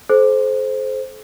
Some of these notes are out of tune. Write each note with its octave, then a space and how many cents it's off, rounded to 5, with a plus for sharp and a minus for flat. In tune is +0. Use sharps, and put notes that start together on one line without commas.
A4 -40 C5 +0